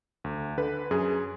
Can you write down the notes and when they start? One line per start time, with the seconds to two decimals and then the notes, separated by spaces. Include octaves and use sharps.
0.24 D2
0.58 D3 B4
0.91 F#2 G#4